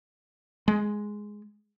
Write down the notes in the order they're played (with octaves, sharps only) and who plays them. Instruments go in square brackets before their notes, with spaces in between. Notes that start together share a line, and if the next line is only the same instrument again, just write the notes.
[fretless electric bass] G#3